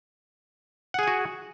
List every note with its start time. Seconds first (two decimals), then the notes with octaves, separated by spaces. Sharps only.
0.94 F#5
0.99 G#4
1.03 G#5
1.08 F#4